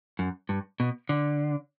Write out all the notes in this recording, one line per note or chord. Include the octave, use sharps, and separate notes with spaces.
F#2
G2
B2
D3